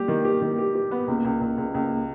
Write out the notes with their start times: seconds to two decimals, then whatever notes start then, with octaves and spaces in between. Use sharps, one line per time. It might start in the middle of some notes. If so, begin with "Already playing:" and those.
Already playing: G3 A#3 G4
0.08 D#3
0.25 G4
0.42 D#3
0.58 G4
0.75 G4
0.91 B3
1.08 C#2 A#3
1.25 C#2
1.41 C#2
1.58 C#2
1.74 C#2 A#3